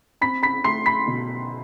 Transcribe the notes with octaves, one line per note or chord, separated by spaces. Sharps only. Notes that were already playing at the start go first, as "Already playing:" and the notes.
C4 B5 B6
B5 B6
A3 C6 C7
B5 B6
B2